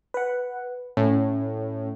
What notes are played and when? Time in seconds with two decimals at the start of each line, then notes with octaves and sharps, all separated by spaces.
0.14 B4 F#5
0.97 A2 C#4